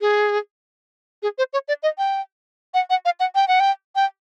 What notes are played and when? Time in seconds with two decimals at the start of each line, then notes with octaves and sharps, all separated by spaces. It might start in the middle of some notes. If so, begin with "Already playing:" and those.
0.01 G#4
1.23 G#4
1.38 C5
1.53 C#5
1.68 D5
1.83 D#5
1.98 G5
2.74 F#5
2.90 F#5
3.05 F5
3.20 F#5
3.35 G5
3.48 F#5
3.60 G5
3.95 G5